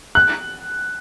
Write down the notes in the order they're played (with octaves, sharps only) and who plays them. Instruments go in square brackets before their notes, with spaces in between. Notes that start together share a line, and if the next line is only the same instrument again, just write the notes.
[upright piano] F#6